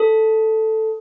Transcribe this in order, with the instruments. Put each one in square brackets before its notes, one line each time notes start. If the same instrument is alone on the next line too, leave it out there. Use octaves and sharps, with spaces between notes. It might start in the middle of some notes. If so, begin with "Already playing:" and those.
Already playing: [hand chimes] A4